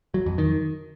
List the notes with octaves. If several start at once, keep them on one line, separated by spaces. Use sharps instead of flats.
F#3
F2
D#3